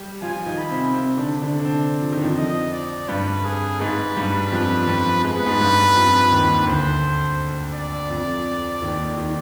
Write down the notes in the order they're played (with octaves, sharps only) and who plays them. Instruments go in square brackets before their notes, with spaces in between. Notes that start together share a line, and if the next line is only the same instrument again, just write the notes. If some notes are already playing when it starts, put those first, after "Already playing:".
Already playing: [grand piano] G3 G4
[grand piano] F3 F4 [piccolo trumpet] G#5
[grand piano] D#3 D#4
[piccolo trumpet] B5
[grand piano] C3 C4
C3 C4
D3 D4
D3 D4
D4
C3 C4
F3
D#3
F2 F3
[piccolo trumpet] D#5
D5
[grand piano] G2 G3 [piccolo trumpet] B4
[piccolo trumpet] G#4
[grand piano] G#2 G#3 [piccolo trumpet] B4
[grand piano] G2 G3
F2 F3
F2 F3
[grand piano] G#3 [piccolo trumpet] B4
[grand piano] B3
G#2 G#3
G2 G3
F2 F3
D#2 D#3
[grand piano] D2 D3 [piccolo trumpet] C5
[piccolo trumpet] D5
[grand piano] F2 F3
D#2 D#3
D#3